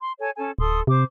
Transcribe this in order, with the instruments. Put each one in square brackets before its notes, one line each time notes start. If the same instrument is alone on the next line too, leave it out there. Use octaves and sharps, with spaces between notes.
[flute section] C6
A4 C#5 G#5
C#4 A4 G#5
[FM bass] D1 [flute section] A4 C6 D#6
[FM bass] C3 [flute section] C5 D6